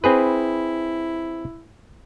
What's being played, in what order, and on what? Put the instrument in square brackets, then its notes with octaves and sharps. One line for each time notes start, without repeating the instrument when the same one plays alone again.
[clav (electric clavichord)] C4 G#4 B4 [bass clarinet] E4